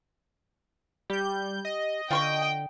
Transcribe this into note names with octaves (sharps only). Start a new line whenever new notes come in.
G3 G4 G6
D#5
D3 F4 G5 C6 C#6